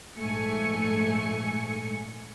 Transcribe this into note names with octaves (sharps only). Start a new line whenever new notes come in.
A#1 G#2 A3 G#5 C#7